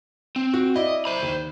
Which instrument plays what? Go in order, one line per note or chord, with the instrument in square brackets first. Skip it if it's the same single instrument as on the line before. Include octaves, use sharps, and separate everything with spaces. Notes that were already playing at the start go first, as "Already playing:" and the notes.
[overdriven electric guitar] C4
[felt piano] F#4
[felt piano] E4 D5 [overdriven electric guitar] D#5
[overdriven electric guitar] C5 B5
[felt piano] D#2